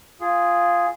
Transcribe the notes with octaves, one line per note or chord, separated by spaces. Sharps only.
F4 G#4